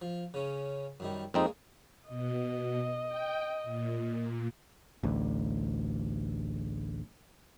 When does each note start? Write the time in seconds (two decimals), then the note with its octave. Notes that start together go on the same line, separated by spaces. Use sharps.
0.02 F3
0.34 C#3 C#4
1.00 F#2 D#3 G3
1.34 F2 G#3 A#3 C4 D#4
2.09 B2 D#5
3.07 G5
3.64 A#2
5.04 A1 D2